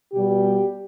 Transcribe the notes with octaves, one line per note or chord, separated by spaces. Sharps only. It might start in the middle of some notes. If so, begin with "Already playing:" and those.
B2 G3 G4